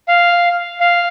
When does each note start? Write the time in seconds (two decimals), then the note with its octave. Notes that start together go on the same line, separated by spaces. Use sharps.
0.08 F5
0.80 F5